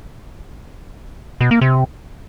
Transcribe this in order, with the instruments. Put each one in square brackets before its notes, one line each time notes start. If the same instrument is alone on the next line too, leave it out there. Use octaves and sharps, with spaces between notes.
[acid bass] B2
A#3
C3